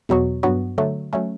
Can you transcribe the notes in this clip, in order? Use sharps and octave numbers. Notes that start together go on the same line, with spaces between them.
E2 B2 F#3 B3 F#4
G2 F#3 B3 F#4
D3 F#3 A3
F#3 A3 C#4